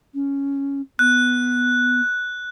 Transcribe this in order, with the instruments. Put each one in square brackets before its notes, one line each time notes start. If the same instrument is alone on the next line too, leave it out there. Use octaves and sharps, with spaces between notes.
[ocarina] C#4
[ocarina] B3 [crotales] F#6